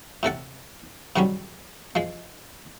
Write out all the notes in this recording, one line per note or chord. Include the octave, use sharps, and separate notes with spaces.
A2 C3 A4 F#5
G#2 D#3 F#3 G3 C#4
F3 G#3